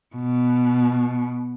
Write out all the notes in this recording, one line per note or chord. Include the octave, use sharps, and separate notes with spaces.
B2